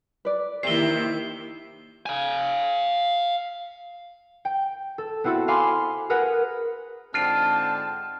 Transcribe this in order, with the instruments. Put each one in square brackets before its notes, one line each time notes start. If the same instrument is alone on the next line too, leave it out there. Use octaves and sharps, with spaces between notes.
[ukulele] B4 D5
[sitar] C3 [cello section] D#3 A#3 E4 [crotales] C7 G7
[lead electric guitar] F5 G#5
[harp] G5
A4
B3 C4 E4 F#4 A4
F5 G#5 B5 C6 D6 F6
G#4 A#4 B4 F#5
[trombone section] G#2 D3 C4 [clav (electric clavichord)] D4 F4 [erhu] A5 [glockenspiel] F6